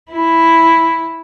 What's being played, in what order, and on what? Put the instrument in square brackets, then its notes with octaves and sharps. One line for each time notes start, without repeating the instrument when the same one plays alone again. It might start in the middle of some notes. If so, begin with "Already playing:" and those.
[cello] E4